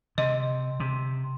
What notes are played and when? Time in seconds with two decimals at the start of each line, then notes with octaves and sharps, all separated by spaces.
0.18 C3 D#5
0.80 C3